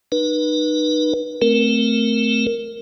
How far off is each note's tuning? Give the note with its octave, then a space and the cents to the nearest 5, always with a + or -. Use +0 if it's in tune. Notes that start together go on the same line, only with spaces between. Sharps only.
D#4 -35 B4 -25
A3 +0 C4 -15 A#4 +0